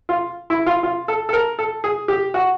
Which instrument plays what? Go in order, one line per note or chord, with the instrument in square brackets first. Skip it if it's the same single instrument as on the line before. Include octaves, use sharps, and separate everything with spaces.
[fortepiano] F4
E4
F4
F4
A4
A4
A#4
A4
G#4
G4
F#4